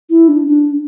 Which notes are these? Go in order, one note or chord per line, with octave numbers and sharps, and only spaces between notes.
E4
D4
D4